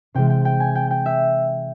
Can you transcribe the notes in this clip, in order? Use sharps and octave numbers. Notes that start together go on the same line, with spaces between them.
C3 E3 G#3 G5
G5
G5
G#5
G5
G5
E5